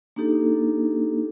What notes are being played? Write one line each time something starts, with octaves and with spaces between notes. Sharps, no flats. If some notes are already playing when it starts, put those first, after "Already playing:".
A#3 D4 D#4 G4 A4